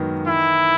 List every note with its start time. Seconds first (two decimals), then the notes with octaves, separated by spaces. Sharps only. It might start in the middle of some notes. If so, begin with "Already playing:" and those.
Already playing: F#2 D#3 G#3 B3
0.27 E3 E4